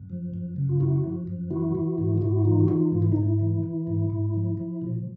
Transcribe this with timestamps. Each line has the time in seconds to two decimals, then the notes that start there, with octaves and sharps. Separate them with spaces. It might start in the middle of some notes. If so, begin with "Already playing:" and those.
Already playing: F#2
0.10 F3
0.34 F#2
0.56 C#3
0.69 F4
0.80 F#2 E4 F#4
1.04 F3
1.27 F#2
1.50 E3 E4 F#4
1.75 E3
1.98 G#2
2.18 F4
2.21 G#2 E4 F#4
2.45 E3 D#4 F4
2.59 F#4
2.68 E3 D#4 F4
2.92 G#2 F4
3.02 E4
3.12 G#2 D#4
3.23 E4
3.39 E3
3.63 E3
3.87 G#2
4.10 G#2
4.34 F3
4.57 F3
4.81 A#2